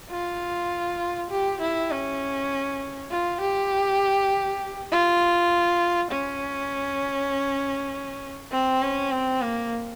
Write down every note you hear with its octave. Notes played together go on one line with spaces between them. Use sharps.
F4
G4
E4
C#4
F4
G4
F4
C#4
C4
C#4
C4
A#3